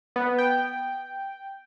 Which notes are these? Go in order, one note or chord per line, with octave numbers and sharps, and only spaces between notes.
B3
G5